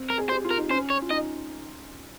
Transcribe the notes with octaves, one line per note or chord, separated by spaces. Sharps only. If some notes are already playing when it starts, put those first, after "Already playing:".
Already playing: C4
A#4
G#4
G4 C5
F4
A#4
D#4
C#4 C5
C#5
F4
D#4 D#5